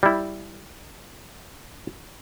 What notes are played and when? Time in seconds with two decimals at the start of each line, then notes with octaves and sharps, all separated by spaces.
0.03 G3 E4